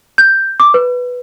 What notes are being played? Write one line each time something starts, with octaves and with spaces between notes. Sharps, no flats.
G6
D6
B4